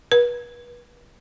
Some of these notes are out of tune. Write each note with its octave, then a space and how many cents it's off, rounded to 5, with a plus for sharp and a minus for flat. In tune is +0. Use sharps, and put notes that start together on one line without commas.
B4 -30